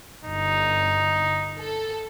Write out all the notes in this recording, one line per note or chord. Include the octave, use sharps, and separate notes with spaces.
G1 D#4
A4